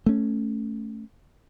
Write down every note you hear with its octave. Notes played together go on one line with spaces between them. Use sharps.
A3 C#4